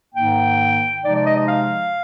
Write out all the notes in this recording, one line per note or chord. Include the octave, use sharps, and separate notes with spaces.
G#2 D#3 A#3 D#4 G5
C3 F3 G#3 D#4 D5
D5
D#5
D#5
F5